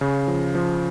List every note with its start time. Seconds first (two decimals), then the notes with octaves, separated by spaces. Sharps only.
0.01 C#3
0.28 F3
0.55 F3